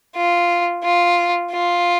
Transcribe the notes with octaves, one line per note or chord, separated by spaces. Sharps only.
F4
F4
F4